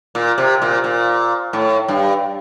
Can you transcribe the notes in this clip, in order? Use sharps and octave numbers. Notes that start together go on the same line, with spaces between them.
A#2
C3
A#2
A#2
A2
G2